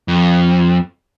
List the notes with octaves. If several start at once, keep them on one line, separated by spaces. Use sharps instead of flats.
F2